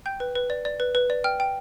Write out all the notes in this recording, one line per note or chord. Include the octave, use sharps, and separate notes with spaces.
G5 G6
B4
B4
D5
D5
B4
B4
D5
G5 F6
G5